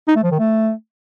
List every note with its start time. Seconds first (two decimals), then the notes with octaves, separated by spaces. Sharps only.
0.08 D#4
0.16 A3
0.24 F3
0.31 D#3
0.39 A3